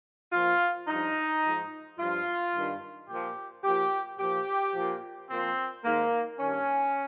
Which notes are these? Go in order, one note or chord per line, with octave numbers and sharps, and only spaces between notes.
A#2 F3 F4
G2 F3 D#4
G#2 F3
G2 F3 F4
G2 D#3
A#2 F3 G4
A#2 F3 G4
A#2 F3 G4
A#2 F3
A#2 F3 C4
G#2 D#3 A#3
G2 D#3 C#4